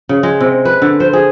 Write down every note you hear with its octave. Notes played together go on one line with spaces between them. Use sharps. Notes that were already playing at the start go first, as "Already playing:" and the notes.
C#3
G#3
C3
B4
D3
C5
G#4